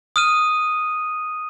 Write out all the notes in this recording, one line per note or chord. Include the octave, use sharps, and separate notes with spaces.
D#6 F6 D#7